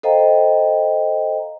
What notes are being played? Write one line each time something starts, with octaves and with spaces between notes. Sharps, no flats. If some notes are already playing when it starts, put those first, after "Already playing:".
A4 C5 D#5 F5 G5 A#5